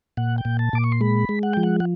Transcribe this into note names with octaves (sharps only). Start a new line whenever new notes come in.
A#2 F#5
G5
A#2
A5
A#2 D6
C#6
C6
G#3 B5
G#3
F#5
F3 G5
F#5
F#5